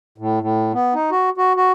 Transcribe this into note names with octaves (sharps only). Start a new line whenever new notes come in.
A2
A2
B3
D#4
F#4
F#4
F#4